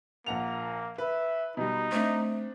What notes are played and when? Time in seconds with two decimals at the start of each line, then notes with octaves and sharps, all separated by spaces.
0.26 A#1 A#3 F#5 F7
0.98 B4 E5
1.57 B2 G3 D#4
1.92 A3 C4 D4